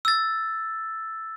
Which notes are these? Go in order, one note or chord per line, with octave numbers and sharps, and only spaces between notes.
E6 A6